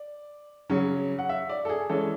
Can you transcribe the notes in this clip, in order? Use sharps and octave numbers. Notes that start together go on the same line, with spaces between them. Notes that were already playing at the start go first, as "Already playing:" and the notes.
Already playing: D5
C#3 F#3 C#4
F#5
E5
D5
A4
G#4
E3 G#3 C#4 A4